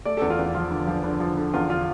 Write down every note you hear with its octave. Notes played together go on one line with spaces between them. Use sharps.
A3 D5
E2 A4
F4
E2
F3 F4
D3
F3
D3
F3
D3
E2 F4
D3 F4